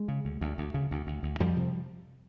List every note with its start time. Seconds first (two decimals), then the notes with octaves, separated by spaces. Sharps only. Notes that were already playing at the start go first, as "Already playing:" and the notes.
Already playing: G#3
0.08 C#3
0.25 D2
0.41 D2
0.58 D2
0.74 C#3
0.91 D2
1.07 D2
1.23 D2
1.40 F2 F3 G3
1.56 C3